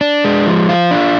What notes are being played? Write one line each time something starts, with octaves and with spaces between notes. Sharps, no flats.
D4
G#3
F3
F4
D4